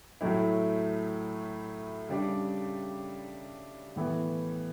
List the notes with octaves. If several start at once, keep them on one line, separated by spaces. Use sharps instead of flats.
A2 F#3 A3 E4
C#3 G3 D4
A2 E3 B3